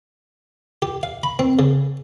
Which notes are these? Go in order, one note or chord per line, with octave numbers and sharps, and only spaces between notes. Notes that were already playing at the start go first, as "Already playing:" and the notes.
G4
F5
B5
C4
C#3